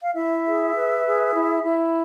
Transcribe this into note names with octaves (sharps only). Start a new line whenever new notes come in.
F5
E4 E5
G#4
B4
G#4
E4
E4